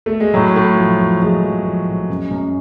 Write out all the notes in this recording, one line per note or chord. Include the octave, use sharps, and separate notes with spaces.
A3
G#3
A2 F#3
A2
F3
F3
A2 F3 G#3
F3
F3
A2
F#2
F#2